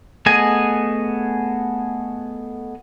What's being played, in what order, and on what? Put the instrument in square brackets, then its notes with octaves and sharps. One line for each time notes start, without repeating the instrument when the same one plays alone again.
[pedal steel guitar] A3 B3 G#4 D#5 G#5